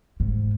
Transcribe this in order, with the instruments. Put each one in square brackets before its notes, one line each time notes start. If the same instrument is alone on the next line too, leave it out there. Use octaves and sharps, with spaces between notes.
[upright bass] G#2